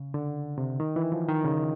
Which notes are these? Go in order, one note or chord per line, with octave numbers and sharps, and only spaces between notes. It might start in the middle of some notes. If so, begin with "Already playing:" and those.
Already playing: C#3
D3
C3
D#3
E3
F3
D#3
C#3